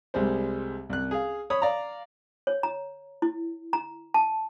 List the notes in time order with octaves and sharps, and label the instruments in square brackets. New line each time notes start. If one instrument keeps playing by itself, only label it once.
[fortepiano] C2 G3 G#3 C5
C2 F#6
G#4 F5
C#5 B5 D#6
D5 F5 A#5
[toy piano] C#5
A#5
E4
A#5
A5